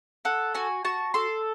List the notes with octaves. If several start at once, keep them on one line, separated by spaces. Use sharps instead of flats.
A4 F#5
F#4 G#5
F#4 A5
A4 C6